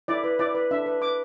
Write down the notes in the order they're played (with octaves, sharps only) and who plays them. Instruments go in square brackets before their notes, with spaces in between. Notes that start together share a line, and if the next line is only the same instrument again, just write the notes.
[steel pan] E4 D5
B4
E4 D5
B4
D4 E5
B4
B4 D6